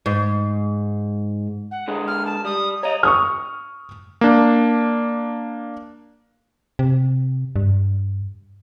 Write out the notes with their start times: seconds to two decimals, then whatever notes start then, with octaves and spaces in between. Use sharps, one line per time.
0.06 G#2
1.71 F#5
1.88 D3 G#3 G#4
2.07 F6
2.26 A5
2.45 G3 D#6
2.83 C#5 D#5 A#5
3.03 C#6 D#6 F6
4.21 A#3 D4
6.79 C3
7.56 G2